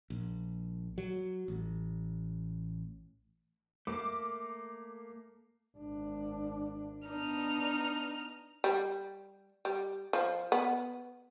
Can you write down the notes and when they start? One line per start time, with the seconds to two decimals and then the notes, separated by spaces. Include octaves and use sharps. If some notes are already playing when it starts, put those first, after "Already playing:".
0.10 A#1
0.98 F#3
1.48 A1
3.87 A3 A#3 D6
5.76 G#1 D4
7.07 B3 D4 D#4 F6
8.64 G3
9.65 G3
10.13 F3
10.52 B3